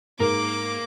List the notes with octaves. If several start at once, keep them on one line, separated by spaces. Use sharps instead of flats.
G#2 A#3 A#4 D6